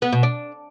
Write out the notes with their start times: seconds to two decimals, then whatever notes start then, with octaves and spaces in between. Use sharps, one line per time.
0.02 B3
0.13 B2
0.23 D4